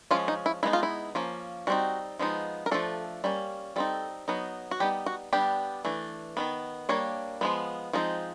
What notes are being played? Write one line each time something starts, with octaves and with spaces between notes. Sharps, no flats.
F3 G#3 C#4 F4
D#4
E4
G#3 B3 D#4 E4
F4
E4
F3 A#3 C#4
G3 C4 D#4 F#4
F3 G#3 B3 D#4
A#4
F3 A3 D4 A4
G3 A#3 C#4
G3 C4 D#4 A4
F#3 B3 D#4
F#4
G3 B3 D#4 G4
F#4
G3 B3 D4 G4
E3 A3 D4
D#3 F#3 B3
G3 A#3 D4 C#5
F3 G#3 B3
F3 G#3 C4 D#4